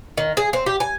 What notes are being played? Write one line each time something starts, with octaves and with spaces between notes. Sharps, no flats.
D#3
G#4
C4
G4
G#5